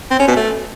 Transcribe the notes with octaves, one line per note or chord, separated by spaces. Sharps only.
C4
C#4
B2
A3